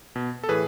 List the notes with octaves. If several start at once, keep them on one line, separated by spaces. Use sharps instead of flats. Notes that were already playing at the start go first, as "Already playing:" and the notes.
B2
A4
A2 E3 G#4 B4